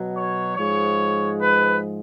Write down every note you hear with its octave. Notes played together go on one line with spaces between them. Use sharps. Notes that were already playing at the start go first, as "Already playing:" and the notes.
Already playing: B2 F#3
C#5
G#2 F3 G#3 C#5
B4